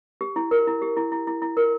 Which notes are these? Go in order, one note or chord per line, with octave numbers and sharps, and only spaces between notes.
G4
E4
A#4
E4
G4
E4
E4
E4
E4
A#4